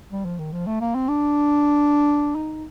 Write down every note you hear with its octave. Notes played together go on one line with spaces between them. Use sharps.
G3
F3
D#3
F3
A3
A#3
C4
D4
D#4